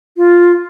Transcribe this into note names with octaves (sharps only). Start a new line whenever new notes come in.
F4